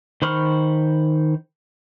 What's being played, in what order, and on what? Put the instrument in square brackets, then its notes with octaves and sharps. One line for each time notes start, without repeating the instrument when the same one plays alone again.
[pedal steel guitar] D#3 C5 B5 C#6 F6